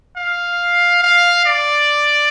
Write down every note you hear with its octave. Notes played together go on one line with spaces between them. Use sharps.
F5
F5
D5